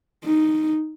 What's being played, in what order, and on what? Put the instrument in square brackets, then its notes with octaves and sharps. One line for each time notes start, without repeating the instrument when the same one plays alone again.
[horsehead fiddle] D#4